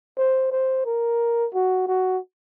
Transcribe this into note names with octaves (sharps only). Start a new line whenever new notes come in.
C5
C5
A#4
F#4
F#4